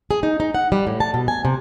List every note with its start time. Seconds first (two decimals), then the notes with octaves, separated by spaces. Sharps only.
0.11 G#4
0.23 D#4
0.40 D#4
0.55 F#5
0.72 G3
0.87 A2
1.00 A5
1.14 B2
1.28 G#5
1.45 C3